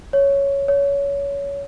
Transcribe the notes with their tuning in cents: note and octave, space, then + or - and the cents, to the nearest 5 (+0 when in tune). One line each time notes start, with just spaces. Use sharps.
C#5 +5
C#5 +20